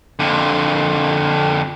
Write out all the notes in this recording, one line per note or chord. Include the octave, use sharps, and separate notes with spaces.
F2 D3